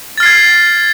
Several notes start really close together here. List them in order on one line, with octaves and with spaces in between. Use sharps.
A6 F6 C7 G#6